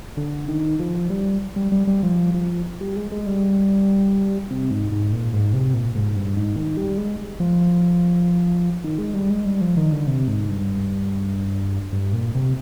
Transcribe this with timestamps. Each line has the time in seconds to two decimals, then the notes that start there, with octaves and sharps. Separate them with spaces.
0.17 D3
0.48 D#3
0.80 F3
1.10 G3
1.56 G3
1.72 G3
1.87 G3
2.03 F3
2.34 F3
2.81 G3
2.96 G#3
3.12 G#3
3.26 G3
4.51 C3
4.71 G#2
4.92 G#2
5.12 A#2
5.33 G#2
5.53 C3
5.74 A#2
5.95 G#2
6.16 G2
6.37 G#2
6.56 D#3
6.77 G3
6.97 G#3
7.40 F3
8.84 D#3
8.98 G#3
9.14 G3
9.30 G#3
9.46 G3
9.61 F3
9.77 D#3
9.92 D3
10.07 C3
10.28 G#2
10.49 G2
11.93 G2
12.13 A#2
12.35 C3